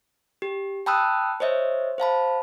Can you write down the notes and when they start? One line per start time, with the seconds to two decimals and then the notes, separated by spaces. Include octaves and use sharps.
0.42 G4
0.86 G5 A5 B5 D#6 E6 F#6
1.40 C5 C#5 D#5 E5
1.98 C5 F5 A5 B5